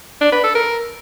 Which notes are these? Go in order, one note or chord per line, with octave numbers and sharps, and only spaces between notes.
D4
B4
A4
A#4